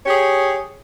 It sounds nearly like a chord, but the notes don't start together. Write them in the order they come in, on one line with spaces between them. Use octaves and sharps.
C#5 G4 G#4